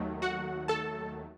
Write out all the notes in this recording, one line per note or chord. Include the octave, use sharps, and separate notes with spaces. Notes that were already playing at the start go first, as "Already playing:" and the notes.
Already playing: D#2 D#3 F#3 A3
F#4 F#5
A4 A5